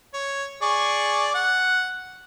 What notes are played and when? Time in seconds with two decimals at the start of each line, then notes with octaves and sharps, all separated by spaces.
0.14 C#5
0.62 G#4 D5 C#6
1.35 F#5